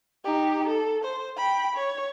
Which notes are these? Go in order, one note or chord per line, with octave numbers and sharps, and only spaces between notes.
D#4 G4
A4
C5
G5 B5
C#5